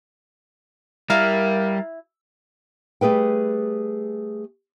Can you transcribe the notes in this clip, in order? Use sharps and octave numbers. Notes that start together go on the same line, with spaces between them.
G3 E4 A#4 F5 A5
G3 A3 G#4 B4 G5